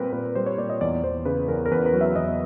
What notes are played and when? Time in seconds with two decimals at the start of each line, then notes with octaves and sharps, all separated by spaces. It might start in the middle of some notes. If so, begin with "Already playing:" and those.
Already playing: A#2 G3 C4 A#4 B4
0.13 A#2 B4
0.35 G3 C5
0.46 C#5
0.58 A#2 D5
0.70 D#5
0.81 E2 D5
1.03 E2 C5
1.25 C#3 B4
1.48 E2 A#4
1.66 A#4
1.71 E2 B4
1.86 B4
1.93 F#3
2.01 E5
2.16 E2 D#5